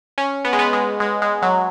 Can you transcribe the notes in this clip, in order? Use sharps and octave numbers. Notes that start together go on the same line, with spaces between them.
C#4
B3
G#3
B3
G#3
G#3
G#3
F#3